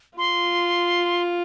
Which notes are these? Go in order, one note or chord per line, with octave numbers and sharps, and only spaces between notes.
F4 C6